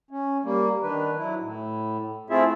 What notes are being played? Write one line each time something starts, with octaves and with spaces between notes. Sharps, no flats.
C#4
G3 A#3
D#3 D4 B4
F#3 E4
A2
A3 C4 E4 F4 G#4 E5